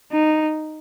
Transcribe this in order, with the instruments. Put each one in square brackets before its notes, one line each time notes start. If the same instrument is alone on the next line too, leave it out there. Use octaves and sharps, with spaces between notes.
[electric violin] D#4